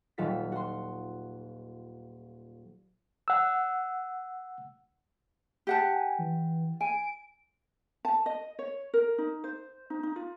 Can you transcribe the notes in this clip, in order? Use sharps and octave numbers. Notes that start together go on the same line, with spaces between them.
D#1 F#3 F4 A4 B6
F#4 C6
F#5 E6
G4 F#5 A5
G#5
E3
G#5 D7
A5
D#5
C#5
A#4
D#4
C5
D#4
D#4
F4